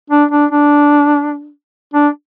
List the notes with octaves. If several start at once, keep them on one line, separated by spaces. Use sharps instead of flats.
D4
D4
D4
D4